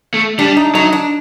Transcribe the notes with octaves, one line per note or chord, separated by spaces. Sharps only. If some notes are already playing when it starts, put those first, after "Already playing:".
A3
G3 D4
D#4
F#3 D#4
D4